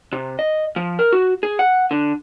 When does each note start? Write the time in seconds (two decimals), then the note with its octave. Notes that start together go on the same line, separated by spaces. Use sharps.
0.12 C3
0.39 D#5
0.76 F3
0.99 A#4
1.13 F#4
1.43 G#4
1.59 F#5
1.91 D3